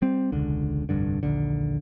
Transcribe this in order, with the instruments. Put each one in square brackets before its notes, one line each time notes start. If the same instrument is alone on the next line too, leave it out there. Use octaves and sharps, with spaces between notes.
[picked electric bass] G3 C4
E1 C#2 D3
F1 C2 G2 D3
A#1 D#2 D3